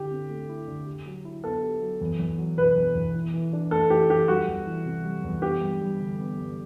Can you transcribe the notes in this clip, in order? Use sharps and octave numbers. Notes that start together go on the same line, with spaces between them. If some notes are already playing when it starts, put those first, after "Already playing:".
Already playing: D3 E4 G4
C4
A3
E4
D3
G4
F#3
E4
B3 A4
G4
F#3
E2
E2
F#3
B2 B4
E2
E2
E3
E3
D4
A3 A4
E3 G4
E3 G4
G3 F#4
E2
E3
C3
G3
E2
B3 G4
G2
G3
D3
B3
G2